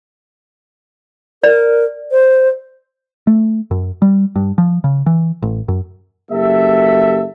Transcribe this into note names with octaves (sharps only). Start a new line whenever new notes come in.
A#4 D5
C5
A3
F#2
G3
G2
F3
C#3
E3
A1
F#2
F#1 F#2 A#3 G4 A4 E5